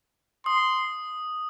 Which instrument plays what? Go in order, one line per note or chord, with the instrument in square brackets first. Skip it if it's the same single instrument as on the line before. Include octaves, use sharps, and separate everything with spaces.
[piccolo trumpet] C6 [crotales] D#6